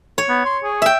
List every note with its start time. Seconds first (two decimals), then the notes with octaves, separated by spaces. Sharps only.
0.18 C#5
0.29 B3
0.45 C6
0.64 G#4
0.82 E5 G5